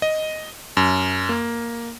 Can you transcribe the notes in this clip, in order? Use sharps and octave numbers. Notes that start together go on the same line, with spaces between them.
D#5
F#2
A#3